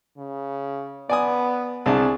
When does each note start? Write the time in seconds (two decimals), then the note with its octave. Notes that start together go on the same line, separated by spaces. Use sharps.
0.18 C#3
1.09 B3 D5 G#5 D#6
1.86 C2 D4 G#4 A5